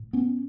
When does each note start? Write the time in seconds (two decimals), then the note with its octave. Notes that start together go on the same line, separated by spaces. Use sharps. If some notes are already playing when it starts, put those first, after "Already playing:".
Already playing: A2
0.13 B3 C#4